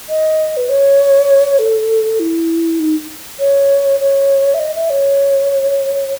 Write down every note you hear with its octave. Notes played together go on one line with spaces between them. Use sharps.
D#5
B4
C#5
A4
E4
D#4
C#5
C#5
E5
D#5
E5
C#5